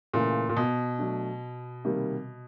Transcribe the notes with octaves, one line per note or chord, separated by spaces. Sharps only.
A#2 C#3 E3 A3 C#4
A#2
B2
F#3 A3 D4
C3 D#3 G3 A#3